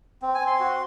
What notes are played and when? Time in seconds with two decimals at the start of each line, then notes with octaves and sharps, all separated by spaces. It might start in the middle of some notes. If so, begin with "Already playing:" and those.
0.22 C4
0.35 G#5
0.41 C4
0.47 C6
0.60 F#4